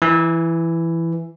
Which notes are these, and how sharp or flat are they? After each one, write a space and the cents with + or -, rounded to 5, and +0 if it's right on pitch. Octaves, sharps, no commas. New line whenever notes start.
E3 +10